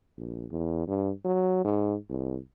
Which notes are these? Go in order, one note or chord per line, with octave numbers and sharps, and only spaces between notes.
A#1
E2
G2
F#3
G#2
C2